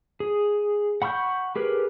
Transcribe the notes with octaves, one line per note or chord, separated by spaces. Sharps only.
G#4
F#5 B5 C#6 E6 G6
G4 G#4 A#4 B4